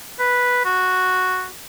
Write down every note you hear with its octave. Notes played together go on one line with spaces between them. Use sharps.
B4
F#4